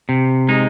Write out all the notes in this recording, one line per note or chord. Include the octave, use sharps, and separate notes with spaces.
C3
G#3 D#4